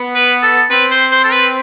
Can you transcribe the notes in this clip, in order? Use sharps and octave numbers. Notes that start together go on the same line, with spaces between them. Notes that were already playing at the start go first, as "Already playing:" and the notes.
Already playing: B3
B4
A4
C4 B4
C5
C5
A4
B4